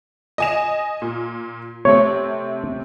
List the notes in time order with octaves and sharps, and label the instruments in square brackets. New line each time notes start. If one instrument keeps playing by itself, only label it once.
[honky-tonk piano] D#5 G#5 E7
A#2
[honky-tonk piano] C3 A3 C4 [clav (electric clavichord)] C#5